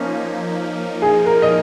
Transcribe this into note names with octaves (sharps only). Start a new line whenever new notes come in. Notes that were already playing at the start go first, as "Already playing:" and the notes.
Already playing: F3 A#3 C#4 D#4
G#4
A#4
D#5